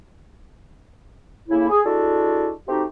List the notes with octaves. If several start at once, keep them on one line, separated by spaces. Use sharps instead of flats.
A2 C#3 A#3 E4
G#4
G#3 D4 E4 F#4 A4
A3 C4 D#4 F#4 G4